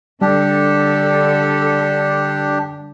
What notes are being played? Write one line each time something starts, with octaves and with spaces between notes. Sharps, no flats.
D3 G3 D4 G4 A4